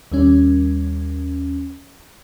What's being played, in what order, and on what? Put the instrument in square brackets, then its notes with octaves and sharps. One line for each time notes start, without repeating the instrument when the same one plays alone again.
[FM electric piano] D#2 G3 C#4